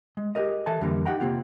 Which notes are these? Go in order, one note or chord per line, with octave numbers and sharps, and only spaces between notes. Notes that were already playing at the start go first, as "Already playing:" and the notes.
G#3
G4 G#4 A#4 D#5
E3 A4 E5 G#5 A5
F2 D3 E3 G3 A#3
D#4 G4 F#5 G5 A#5
C3 D#3 A#3 C4 F4 G4